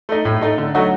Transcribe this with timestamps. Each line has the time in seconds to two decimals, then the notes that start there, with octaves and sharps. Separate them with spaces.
0.09 A3 D#4
0.25 A2
0.41 A3 D#4
0.58 D3
0.75 F#3 A3 D#4 F#4